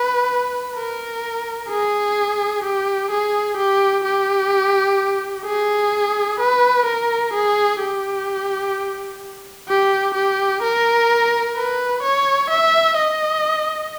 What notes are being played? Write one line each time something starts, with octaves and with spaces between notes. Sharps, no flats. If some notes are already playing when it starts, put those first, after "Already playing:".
Already playing: B4
A#4
G#4
G4
G#4
G4
G4
G#4
B4
A#4
G#4
G4
G4
G4
A#4
B4
C#5
E5
D#5